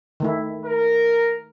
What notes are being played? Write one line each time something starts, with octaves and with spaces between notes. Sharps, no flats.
D#3 A3 E4
A#4